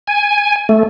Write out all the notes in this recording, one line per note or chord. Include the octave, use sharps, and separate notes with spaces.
G#5
A3